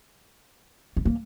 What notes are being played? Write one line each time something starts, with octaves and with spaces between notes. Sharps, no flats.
B3
A#3